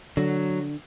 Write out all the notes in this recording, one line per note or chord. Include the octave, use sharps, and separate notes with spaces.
D3 F#3